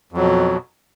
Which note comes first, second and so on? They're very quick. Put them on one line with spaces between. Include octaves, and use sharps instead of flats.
F2 F#3 B2